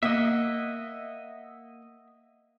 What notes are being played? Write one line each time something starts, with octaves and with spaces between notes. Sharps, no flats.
A#3 D#5 E5 F#5